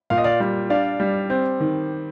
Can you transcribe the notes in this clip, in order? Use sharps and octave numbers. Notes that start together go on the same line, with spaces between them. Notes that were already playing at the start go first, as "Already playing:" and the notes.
A#2 F5
D#5
D5 F5
G3
D4 D5 F5
G3
C4
D#3